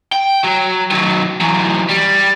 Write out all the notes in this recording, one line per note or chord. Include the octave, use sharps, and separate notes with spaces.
G5
F#3
D#3 F#3
E3 F#3
G3